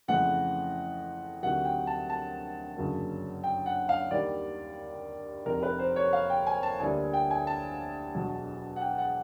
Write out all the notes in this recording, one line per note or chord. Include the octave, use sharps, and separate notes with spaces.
F2 C#3 E3 A3 F#5
D2 C3 D#3 F#3 F#5
G5
A5
A5
G1 F#2 C#3 F#3 A#3
G5
F#5
F5
D#2 D#3 G3 D5
F1 F2 C3 D#3 A#4
B4
C5
C#5
F5
G5
G#5
A5
D2 D3 G3 A#3 G#5
G5
G#5
A5
E1 E2 B2 F#3
F#5
G5
F#5